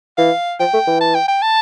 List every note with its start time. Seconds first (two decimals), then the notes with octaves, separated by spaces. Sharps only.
0.18 E3 F5
0.60 F3 G5
0.74 A3
0.87 E3
1.01 A5
1.14 G5
1.28 G5
1.42 A5